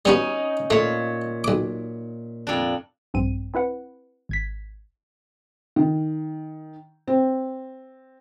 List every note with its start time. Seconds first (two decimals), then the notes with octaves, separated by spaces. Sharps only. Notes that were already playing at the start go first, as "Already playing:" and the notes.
0.05 G3 B3 C#4 D#4 F#4
0.70 A#2 A3 C#5
1.44 B1 D6
2.47 F2 D4
3.14 A#1 G2 C4 D#7
3.54 C4 E4 B4 F#5
4.29 G#1 G#6 B6
5.76 D#3
7.08 C4